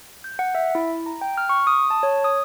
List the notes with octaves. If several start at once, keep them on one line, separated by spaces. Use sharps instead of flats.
G6
F#5
E5
E4
A#5
G5
F6
C#6
D#6
A5
C#5
D#6